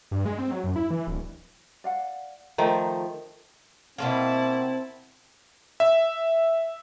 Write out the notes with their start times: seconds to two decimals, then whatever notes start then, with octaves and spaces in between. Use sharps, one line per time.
0.11 G2
0.25 G#3
0.38 C4
0.51 F#3
0.64 F#2
0.76 E4
0.90 E3
1.07 D1
1.84 D5 F5 F#5
2.58 D#3 F3 A3 G5 A#5
3.98 B2 G#3 A#3 C4 E4 A5
5.80 E5